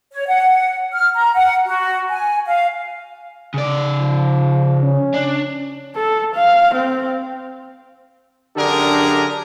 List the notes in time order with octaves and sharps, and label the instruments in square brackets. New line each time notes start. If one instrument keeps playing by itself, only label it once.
[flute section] C#5
F#5
F6
A#5
F#5
F#4
G#5
F5
[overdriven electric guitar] C#3 D5
[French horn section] F3
C#4
[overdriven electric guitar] D4
[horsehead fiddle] A4
F5
C4
[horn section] F#2 D3 D4 G4 G#4 A#4